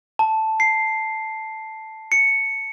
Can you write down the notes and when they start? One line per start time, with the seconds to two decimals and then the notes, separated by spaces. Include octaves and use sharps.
0.19 A5
0.60 C7
2.12 C#7